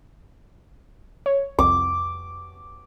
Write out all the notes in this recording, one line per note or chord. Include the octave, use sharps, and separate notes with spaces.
C#5
C2 F2 D6